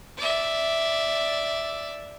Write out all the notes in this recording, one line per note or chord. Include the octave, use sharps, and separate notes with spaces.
D5 E5